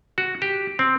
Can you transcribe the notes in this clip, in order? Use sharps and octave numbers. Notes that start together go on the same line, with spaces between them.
F#4
G4
C4